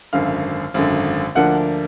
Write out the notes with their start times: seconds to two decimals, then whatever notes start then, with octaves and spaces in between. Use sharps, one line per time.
0.13 G#1 F#2 D3 F5
0.74 G#1 F#2 D3
1.35 D2 D3 F3 A#3 D4 F#5